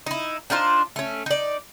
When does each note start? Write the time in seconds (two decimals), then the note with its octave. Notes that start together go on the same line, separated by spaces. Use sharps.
0.06 D#4 E4
0.50 D4 D#4 F4 C5
0.96 A3 C#4
1.26 D#4 D5